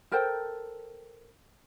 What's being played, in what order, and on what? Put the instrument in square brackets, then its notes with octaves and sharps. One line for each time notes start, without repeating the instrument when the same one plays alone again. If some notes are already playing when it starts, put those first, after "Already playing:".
[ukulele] A4 A#4 C5 G5